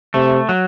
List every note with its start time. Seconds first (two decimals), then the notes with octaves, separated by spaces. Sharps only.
0.14 C3 A3
0.49 F#3